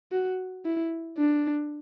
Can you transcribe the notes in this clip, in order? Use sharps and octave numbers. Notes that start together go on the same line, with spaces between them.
F#4
E4
D4